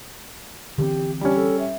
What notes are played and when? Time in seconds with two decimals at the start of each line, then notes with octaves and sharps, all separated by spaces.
0.78 D3 E3 C4 G4
1.21 G3 C#4 D4
1.36 A4
1.59 E5